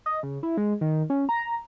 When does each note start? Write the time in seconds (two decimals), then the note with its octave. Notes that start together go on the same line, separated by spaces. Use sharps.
0.06 D#5
0.23 C#3
0.43 E4
0.57 G#3
0.81 D#3
1.10 C#4
1.29 A#5